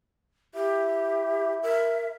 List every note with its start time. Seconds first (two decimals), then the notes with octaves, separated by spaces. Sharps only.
0.55 E4 G4
1.63 A#4 E5